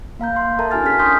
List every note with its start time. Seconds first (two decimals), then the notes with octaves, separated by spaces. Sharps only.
0.19 A#3 F5 A#5 G6
0.36 C6
0.59 A4 A#4 E5 A5 A#5
0.71 D4 E4 F#4 G#5 F6 A6
0.84 C#4 G#4 F6 B6
0.99 G#5 C6 C#6 D#6 F6 G6